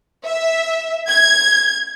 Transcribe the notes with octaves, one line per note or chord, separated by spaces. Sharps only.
E5
G#6